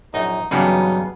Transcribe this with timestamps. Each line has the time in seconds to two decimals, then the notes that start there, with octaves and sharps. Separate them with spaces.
0.14 A#1 F#2 D#4
0.51 G2 C#3 E3 F#3 G3 B3 D#4